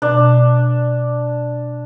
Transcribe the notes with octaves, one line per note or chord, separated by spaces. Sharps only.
B2 D4